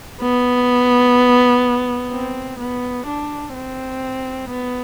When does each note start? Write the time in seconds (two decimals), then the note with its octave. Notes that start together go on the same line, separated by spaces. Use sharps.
0.21 B3
2.12 C4
2.60 B3
3.07 D4
3.55 C4
4.50 B3